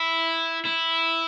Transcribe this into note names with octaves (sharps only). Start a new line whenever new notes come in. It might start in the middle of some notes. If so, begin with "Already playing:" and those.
Already playing: E4
E4